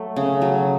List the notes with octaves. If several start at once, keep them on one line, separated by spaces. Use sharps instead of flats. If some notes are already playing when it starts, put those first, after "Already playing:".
Already playing: F#3 A3
C#3
F#3